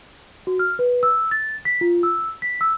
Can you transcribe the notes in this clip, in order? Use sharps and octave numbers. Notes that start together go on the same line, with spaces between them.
F#4
F6
B4
E6
A6
B6
F4
E6
B6
E6